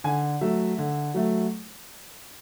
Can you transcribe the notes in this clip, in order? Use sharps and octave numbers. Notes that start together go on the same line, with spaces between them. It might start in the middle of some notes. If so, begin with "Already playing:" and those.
D3 G#5
F#3 A3 E5
D3
F#3 A3